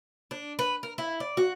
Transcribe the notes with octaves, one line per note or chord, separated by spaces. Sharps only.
D4
B4
A#4
E4
D5
F#4